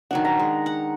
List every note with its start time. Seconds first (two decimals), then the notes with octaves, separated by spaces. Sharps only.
0.11 D#3 F#3 D4 F#5
0.25 A#5
0.39 G#3
0.66 F#5